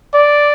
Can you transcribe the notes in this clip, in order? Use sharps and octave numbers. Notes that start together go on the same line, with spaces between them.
D5